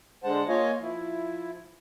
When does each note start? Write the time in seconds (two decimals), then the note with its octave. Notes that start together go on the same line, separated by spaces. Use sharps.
0.24 D3 G#3 C5 F#5 A5
0.48 A#3 F4 C#5 D#5 F5 G#5
0.80 F3 E4